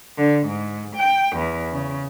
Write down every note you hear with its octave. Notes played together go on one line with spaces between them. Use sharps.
D3
G#2
G5
E2
C#3